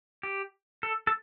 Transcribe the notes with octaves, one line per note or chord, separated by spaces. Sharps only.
G4
A4
A4